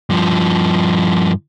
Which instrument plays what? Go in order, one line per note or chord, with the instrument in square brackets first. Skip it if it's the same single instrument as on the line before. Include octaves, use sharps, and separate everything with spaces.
[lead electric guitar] G2 F3